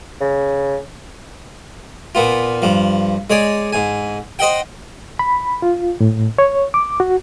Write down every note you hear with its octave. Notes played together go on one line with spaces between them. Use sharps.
C#3
A#2 B3 F4
G2 F3
G#3 C#5 D5 G#5
G#2 G#5
C5 D#5 F#5 G5
B5
F4
A2
C#5
D6
F#4